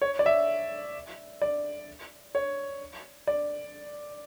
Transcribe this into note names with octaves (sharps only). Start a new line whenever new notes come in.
C#5
D5
E5
D5
C#5
D5